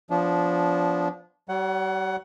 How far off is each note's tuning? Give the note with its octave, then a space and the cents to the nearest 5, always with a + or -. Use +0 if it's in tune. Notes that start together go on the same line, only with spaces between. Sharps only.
F3 +0 B3 +0 D4 -25
G3 -45 C#5 +0 F#5 +20